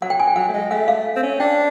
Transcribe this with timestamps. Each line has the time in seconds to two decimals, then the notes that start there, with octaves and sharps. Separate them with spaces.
0.02 F#3 F#5
0.10 G5
0.20 G#5
0.27 G5
0.36 F#3 F#5
0.48 A3
0.54 G#3
0.71 A3 F#5
0.88 F5
1.16 C4
1.23 C#4
1.40 D4 G5